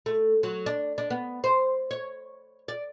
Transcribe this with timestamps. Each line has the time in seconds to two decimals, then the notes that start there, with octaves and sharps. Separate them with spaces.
0.06 A3
0.43 F#3
0.66 D4
0.98 D4
1.10 B3
1.44 C5
1.91 C#5
2.68 D5